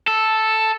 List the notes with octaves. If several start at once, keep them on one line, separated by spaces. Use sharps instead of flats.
A4